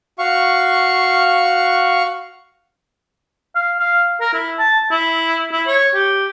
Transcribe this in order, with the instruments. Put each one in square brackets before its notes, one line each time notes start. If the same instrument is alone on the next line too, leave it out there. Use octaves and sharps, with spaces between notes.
[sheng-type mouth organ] F#4 F5 C#6
[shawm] F5
F5
A#4
E4
A5
E4
E4
C#5
G4